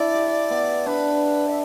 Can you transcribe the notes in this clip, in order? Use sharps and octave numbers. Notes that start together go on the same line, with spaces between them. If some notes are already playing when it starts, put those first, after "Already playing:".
Already playing: D4 E4 D5
G4
B3
D4 B4
E5